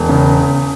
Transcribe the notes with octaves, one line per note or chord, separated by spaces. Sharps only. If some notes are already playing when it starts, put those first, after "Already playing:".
Already playing: E1
C#3